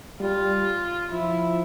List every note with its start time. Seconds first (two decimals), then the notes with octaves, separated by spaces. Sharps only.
0.20 G3 F4
1.11 F3 E4